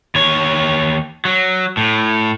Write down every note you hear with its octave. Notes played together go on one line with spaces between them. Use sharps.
D#2 C#5
F#3
A2